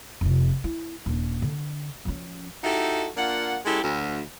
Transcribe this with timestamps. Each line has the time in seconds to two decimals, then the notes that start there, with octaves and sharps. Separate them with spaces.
0.21 F1 C3
0.64 E4
1.06 D#1 D4
1.42 D3
2.05 F3 C#4
2.63 D#4 E4 F#4 G4 A4
3.17 A#3 D4 F4 F#5
3.65 G#3 C#4 E4 G4 A4
3.82 D2